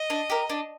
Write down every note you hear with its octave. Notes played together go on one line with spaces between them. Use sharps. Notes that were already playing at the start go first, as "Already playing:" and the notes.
Already playing: D#5
D4
G4 A#4
D4